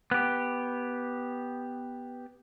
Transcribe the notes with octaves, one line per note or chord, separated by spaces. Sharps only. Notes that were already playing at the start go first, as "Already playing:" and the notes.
B3 G4